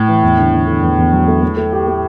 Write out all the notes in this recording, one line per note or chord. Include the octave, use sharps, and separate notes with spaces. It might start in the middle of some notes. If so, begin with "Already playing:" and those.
Already playing: A2
E3
E2
D3
D3
D3
E2
E2
F#3
A3
A3
A3
G4
A3